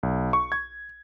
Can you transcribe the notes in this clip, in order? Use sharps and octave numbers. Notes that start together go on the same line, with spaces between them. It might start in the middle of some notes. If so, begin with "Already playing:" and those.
B1
C#6
G#6